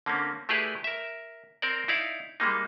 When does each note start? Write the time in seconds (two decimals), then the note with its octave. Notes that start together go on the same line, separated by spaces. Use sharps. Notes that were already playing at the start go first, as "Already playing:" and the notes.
0.06 D3 A#3 C4 C#4
0.49 A3 E4 G4 G#4 B4 D5
0.84 A#4 E5
1.62 C4 A#4 C5 D5
1.88 D#4 E4 D5 F5
2.40 G3 G#3 A#3 D#4